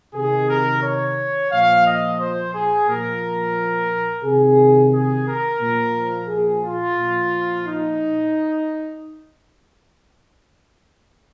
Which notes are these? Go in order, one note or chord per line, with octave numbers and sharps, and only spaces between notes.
C3 D#3 G#4
A#4
C#5
A#2 F3 F5
D#5
C5
G#4
A#2 F3 A#4
C3 D#3 G#4
G#4
A#4
A#2 F3
G#4
F4
A#2 F3
D#4